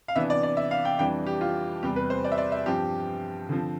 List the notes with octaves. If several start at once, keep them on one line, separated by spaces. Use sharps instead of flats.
F5
C3 E3 B3 D4 E5
D5
D5
E5
F5
G5
F2 E3 G3 D4 G5
G4
F4
E2 C3 G3 G4
B4
C5
D5
E5
D5
E5
G2 F3 C4 G4
D3 F3 C4